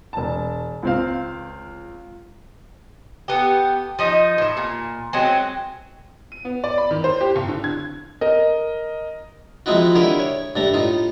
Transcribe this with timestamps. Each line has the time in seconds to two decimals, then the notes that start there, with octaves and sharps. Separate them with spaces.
0.13 E1 A5
0.83 C#2 C4 F5
3.28 A3 B3 G4
3.99 F3 D#4 D#5
4.38 A2 E5
4.57 A#2
5.13 F#3 G#3 C4
6.32 D#7
6.45 B3
6.64 D5
6.78 B5
6.91 D#3
7.04 C5
7.21 G4
7.36 F#1
7.48 D3
7.64 G#6
8.21 A#4 D#5
9.66 F3 G#3 C4 D#4 E4 F#4
9.95 D3 E4 G4 G#4 A#4
10.19 C#5
10.56 G2 A3 A#5
10.74 A2 D#4 F4